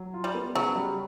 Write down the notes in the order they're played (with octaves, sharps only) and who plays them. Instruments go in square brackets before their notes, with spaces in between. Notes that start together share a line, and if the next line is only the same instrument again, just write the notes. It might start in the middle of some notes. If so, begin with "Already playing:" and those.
Already playing: [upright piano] F#3
F4
[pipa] G3
[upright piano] B3
[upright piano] C#3 [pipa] F#3
[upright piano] G3